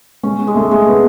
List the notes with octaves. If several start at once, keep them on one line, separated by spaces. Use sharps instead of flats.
G#3 C#4
G#3
A3
G#3
B3